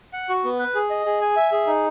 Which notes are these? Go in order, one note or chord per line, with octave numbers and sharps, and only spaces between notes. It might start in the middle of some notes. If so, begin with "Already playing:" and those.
F#5
F#4
B3
B4
G#4
D#5
G#4
G#5
E5
G#4
D#4